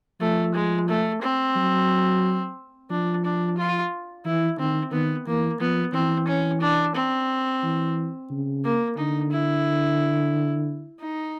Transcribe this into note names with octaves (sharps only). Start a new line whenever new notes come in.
F3 A3
G#3
A3
C4
F#3
F3 D4
D4
F4
E3 E4
D#3 C4
D#3 B3
E3 A#3
F3 B3
E3 C4
C#4
D4
C4
E3
C#3
A#3
D3 D#4
E4
D#4